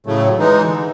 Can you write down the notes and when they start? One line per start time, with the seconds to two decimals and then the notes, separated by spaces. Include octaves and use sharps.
0.06 A2 C#3 F#3 A3
0.39 E3 G#3 D#4
0.66 D3